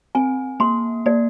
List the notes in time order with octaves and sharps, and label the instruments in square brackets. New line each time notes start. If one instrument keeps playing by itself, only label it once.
[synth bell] C4 [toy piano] G#5
[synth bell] A#3 [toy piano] C6
[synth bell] A#3 [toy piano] D5